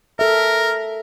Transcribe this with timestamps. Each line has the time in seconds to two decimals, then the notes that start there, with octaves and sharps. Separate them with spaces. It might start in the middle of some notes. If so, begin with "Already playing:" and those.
0.19 A4 A#4 E5